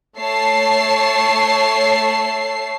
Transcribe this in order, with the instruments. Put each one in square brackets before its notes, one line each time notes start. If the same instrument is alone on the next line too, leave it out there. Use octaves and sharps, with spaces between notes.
[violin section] A3 C#5 A5 C7